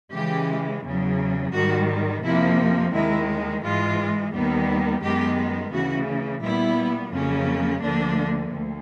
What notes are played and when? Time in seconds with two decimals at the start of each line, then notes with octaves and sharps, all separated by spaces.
0.13 C#3 E3 G#3 G4
0.84 E2 C#3 F#3
1.53 G#2 D#3 G3 F#4
2.23 F2 C3 F3 A#3 E4
2.93 D#2 D#3 G#3 E4
3.62 G#2 E3 G#3 F4
4.32 D#2 D#3 G3 B3
5.02 F#2 D#3 G#3 B3 G4
5.72 D2 C#3 E3 F#4
6.42 A#2 G3 B3 E4
7.12 F2 C#3 F#3 A#3 C#4
7.81 D2 D3 F3 A#3 D4
8.51 D2